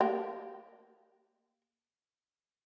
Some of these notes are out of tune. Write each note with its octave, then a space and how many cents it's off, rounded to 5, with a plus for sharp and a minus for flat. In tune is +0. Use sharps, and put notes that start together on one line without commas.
A#3 +0 G4 +0